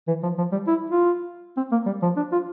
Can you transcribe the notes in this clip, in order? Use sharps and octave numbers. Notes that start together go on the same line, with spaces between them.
E3
F3
F3
G3
E4
F4
C4
A#3
G3
F3
D4
F4